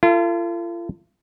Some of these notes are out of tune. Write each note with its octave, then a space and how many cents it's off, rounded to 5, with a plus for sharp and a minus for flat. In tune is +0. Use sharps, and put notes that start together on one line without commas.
F4 -40 A4 +40